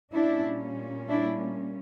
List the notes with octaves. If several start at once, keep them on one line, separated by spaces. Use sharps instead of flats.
A#2 G3 A#3 C#4 D4 E4
D4 E4